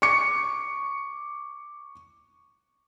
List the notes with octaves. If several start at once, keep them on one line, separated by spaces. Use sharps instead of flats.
C#6 D6 C#7